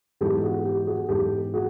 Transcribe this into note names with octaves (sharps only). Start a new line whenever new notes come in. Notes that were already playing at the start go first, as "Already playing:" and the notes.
G#2 E3 G#3 B3 G4 A4
F#4 G#4
G4
F#4 G#4
G#2 E3 G#3 B3 G4 A4
F#4 G#4